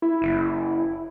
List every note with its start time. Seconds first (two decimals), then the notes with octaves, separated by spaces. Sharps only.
0.02 E4
0.22 F#1